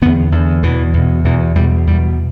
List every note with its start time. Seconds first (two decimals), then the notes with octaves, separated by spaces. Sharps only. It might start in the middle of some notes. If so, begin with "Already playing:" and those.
0.02 E2 D3 B3
0.32 E2 D3
0.63 E2 B2 E3
0.94 E2 B2
1.25 E2 B2 E3
1.55 E2 B2 G3
1.87 E2 B2 G3